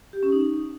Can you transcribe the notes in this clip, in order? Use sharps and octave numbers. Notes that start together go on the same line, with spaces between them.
G4
C#4
D#4